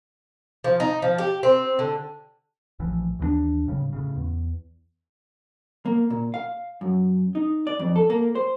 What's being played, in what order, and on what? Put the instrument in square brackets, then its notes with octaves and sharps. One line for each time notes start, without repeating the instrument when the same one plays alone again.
[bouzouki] F3
D#4
F3
G4
C4
D3
[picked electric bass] A#1 A2 E3 F3
D#2 E3 G#3 D4
G#1 A2 C#3 G3
A2 C#3
E2
[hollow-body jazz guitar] A#3
A#2
F5
F#2
D#4
D5
F2
A4
A#3
C5